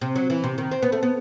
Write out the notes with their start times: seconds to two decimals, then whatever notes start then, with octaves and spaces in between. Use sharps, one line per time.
0.01 C3
0.16 F#3
0.30 E3
0.44 C3
0.58 D#3
0.71 C4
0.83 B3
0.92 A3
1.03 B3